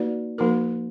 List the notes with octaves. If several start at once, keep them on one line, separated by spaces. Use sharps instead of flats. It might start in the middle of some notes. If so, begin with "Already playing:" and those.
Already playing: A#3 D#4 F#4 B4 D5
F3 A#3 D#4 F#4 A#4